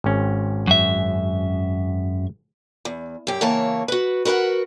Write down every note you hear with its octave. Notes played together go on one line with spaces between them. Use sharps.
G#1 C#4
F#2 E5
E2
F#2 G4
C#3 E3 A#3 C#5 A5
F#4 B4
F#4 A#4 B4 E5 F#5